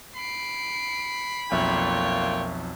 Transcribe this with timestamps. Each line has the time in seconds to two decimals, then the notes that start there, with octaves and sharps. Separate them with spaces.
0.16 B5 C7 D7
1.51 B1 F2 A#2 A#3 C#5 E5 G5